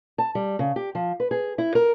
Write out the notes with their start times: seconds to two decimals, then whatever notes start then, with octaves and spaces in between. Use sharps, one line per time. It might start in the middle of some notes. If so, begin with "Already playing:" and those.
0.18 A5
0.35 G3
0.59 C#3
0.76 G4
0.95 F3
1.20 B4
1.31 G#4
1.58 E4
1.75 A#4